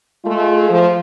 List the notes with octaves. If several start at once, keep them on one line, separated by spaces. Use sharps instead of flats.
G#3 A3 F4
F3